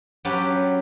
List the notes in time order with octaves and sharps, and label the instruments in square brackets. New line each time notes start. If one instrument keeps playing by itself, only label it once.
[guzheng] F#3 C#4 G4 B4 G5 A5